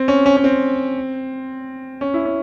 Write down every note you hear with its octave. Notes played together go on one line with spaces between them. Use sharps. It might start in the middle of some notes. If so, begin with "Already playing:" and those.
Already playing: C4
C#4
C#4
C#4
C4
C#4
E4
C#4